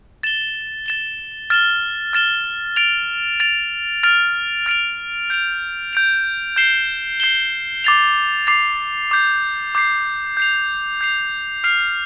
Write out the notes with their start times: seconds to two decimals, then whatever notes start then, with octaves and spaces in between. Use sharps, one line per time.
0.23 A6 E7 G7
0.86 A6 E7 G7
1.50 F6 A6 E7 G7
2.13 F6 A6 E7 G7
2.76 A6 D7 F7
3.40 A6 D7 F7
4.03 F6 A6 D7 F7
4.66 F6 A6 D7 F7
5.30 G6 D7 F7
5.93 G6 D7 F7
6.56 G6 C7 E7 G7
7.20 G6 C7 E7 G7
7.84 D6 A6 C7 F7
8.47 D6 A6 C7 F7
9.11 D6 G6 C7
9.75 D6 G6 C7
10.37 G6 C7 F7
11.01 G6 C7 F7
11.64 F6 C7 F7